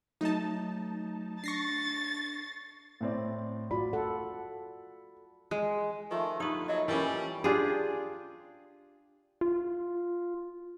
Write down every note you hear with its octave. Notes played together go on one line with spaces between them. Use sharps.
F#3 A3 D#4 A5
D4 C#6 A6 A#6 C7
A2 C4 D5
F4 F#4 D5 B5
A4 F#5
G#3
D#3 F3 A3
D3 A#3 D#4 G4 B4 D#6
F#3 D#5 E5
E3 G3 C#4 E4 A#4 D6
D4 F4 G4 G#4
F4